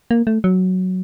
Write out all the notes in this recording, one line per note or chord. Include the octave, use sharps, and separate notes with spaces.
A#3
A3
F#3